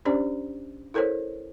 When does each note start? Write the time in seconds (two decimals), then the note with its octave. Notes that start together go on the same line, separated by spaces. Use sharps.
0.05 C#4 D4 G4 C5 D5
0.94 E4 A4 A#4 C5 C#5